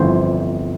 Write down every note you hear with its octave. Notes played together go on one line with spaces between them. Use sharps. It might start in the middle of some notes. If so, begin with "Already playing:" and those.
Already playing: G1 F2 E3 C5